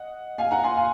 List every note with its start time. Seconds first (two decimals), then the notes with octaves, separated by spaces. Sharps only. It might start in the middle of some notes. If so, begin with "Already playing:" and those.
Already playing: D#5 F#5
0.38 F5 G#5
0.51 F#5 A#5
0.64 G#5 C6
0.77 F5 G#5